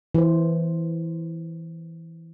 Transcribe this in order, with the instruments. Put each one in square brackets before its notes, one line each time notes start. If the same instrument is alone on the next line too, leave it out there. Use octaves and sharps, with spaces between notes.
[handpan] E3 C5